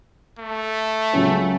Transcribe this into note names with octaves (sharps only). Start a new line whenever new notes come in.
A3
C#2 C#3 F#3 C#4